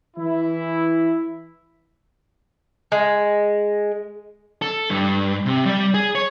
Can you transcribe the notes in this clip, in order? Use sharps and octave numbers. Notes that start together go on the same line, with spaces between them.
E3 E4
G#3
A4
G2
C3
G3 D5
G#4
C#5